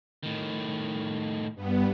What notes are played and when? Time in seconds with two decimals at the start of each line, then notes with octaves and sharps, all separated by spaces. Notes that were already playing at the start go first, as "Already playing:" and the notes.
0.23 A2 D#3
1.55 G2 B3